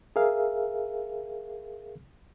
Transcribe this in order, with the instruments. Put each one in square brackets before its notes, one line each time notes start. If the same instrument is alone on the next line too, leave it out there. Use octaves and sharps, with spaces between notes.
[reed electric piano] G#4 A#4 E5 F5